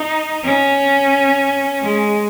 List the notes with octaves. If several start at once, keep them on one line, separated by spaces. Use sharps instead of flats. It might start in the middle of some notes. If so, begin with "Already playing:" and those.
Already playing: D#4
C#4
G#3